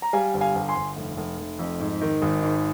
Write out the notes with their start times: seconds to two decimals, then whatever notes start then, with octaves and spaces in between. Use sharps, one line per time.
0.02 A#5
0.13 G3 F5 G#5
0.34 G1
0.41 F5 G#5
0.55 G1
0.69 G#5 C6
0.76 G1
0.97 F1
1.17 F1
1.38 F1
1.59 F2
1.80 G#2
2.01 D#3
2.22 G#1
2.42 G#2